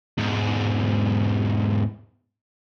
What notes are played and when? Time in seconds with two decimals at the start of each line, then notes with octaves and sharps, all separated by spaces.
0.18 E2 G#2